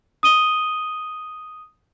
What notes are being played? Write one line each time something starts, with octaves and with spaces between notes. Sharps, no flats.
D#6 D#7 G7